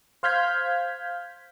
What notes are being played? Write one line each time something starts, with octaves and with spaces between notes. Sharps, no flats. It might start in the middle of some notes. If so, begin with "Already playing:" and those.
C5 F5 F6 G6 G#6 B6